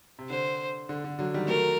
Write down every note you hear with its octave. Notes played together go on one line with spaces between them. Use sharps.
C3
D3 C5
D3
D3
D3 F#3
D#3 G3
F#3 A3 A#4